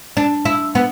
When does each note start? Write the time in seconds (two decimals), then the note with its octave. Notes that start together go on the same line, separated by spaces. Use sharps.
0.17 D4
0.45 E4
0.75 B3